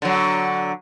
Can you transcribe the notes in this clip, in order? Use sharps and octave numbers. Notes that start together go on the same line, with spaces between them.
D3 F#3